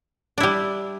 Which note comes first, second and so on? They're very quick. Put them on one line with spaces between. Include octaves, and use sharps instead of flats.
D4 E4 G3